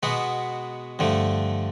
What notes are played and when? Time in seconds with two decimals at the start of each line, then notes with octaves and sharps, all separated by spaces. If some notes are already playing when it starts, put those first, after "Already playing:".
0.03 B2 G#3 B3 F#4
0.99 G2 D3 F3 A3